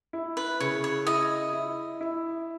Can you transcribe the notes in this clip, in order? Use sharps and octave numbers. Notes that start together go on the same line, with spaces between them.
E4
B4
C#3 C#5
C#5
E4 D#5
E4
E4